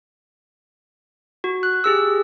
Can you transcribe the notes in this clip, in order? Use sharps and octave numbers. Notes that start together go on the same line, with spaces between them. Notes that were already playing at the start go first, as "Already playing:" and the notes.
F#4
F#6
G4 G#4 E6